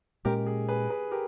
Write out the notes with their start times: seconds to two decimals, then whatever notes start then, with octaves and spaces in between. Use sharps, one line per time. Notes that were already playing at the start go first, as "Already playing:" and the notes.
0.25 A#2 G#3 C#4 G4 A#4
0.47 G#4
0.68 G#4 B4
0.90 G#4 B4
1.11 G4 A#4